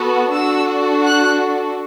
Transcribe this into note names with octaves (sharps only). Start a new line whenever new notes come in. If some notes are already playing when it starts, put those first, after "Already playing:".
Already playing: B3 F#4 A4
D4 F#4 A4 E6
F#6